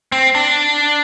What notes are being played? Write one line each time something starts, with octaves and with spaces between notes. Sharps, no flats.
C4
D4